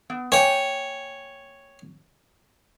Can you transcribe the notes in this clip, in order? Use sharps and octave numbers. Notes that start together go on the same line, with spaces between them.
B3
A#3 C#5 G5 G#5